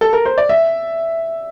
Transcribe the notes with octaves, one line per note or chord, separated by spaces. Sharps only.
A4
A#4
C5
D5
E5